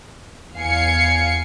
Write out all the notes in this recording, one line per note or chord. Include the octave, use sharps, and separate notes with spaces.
E2 F5 G#5 C7 C#7